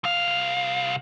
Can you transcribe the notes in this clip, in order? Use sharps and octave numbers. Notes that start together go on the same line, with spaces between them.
C2 F5